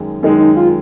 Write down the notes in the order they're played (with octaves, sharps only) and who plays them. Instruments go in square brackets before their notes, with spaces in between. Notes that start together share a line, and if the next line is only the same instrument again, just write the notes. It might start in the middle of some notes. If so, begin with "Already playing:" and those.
Already playing: [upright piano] F#2 D#3 G#3
[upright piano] F#2 D#3 G#3 [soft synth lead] D#4
[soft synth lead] D#4
F4